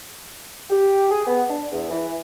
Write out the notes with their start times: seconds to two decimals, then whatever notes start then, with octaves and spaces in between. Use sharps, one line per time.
0.70 G4
1.10 G#4
1.27 B3
1.49 D4
1.72 E2
1.91 E3